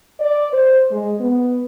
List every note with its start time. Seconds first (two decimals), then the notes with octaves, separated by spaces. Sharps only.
0.20 D5
0.53 C5
0.91 G#3
1.20 B3